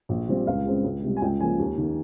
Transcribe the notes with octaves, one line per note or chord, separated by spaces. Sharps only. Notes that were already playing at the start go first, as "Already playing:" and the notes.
A#1
A#2 G3 C4
C#2 F5
C#3 G#3 C4
C#2
C3 G3
G#5
C#2 G5
C#3 F3 A#3 G#5
D#2
D#3 A#3